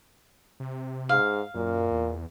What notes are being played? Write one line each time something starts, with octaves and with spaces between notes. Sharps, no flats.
C3
G#2 F5
F#2 A#2
E2